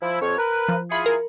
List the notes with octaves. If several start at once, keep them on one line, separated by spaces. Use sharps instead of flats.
F3 E4
F2 C#5
A#4 B4
F3
E4 F4 G#4 B5 C#7
A#4